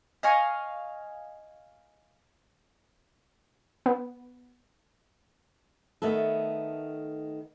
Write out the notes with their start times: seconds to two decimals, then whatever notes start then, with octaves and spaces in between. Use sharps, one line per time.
0.23 D#5 F5 G#5 C#6
3.86 B3
6.02 D#3 A3 B3 A4